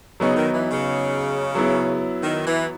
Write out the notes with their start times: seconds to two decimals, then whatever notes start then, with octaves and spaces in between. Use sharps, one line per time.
0.20 C#3 F#3 B3 D#4
0.37 D#3
0.54 E3
0.70 C#3
1.55 F#3 B3 E4
2.23 D#3
2.46 E3